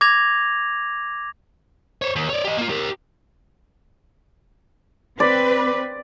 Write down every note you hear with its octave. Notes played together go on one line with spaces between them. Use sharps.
D6 G#6 A#6 F7
C5 C#5
D#2
C#5 D5
G4 D#5
A#3 F4
G4 A#4
C4 B4 D5